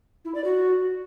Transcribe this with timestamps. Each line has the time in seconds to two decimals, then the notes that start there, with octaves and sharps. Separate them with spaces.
0.25 E4
0.35 D5
0.44 F#4